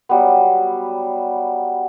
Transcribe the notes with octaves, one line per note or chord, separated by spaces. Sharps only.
F#3 G3 B3